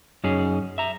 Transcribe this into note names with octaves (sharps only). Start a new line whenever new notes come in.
F#2 C#4 D#4 G#4
E5 A#5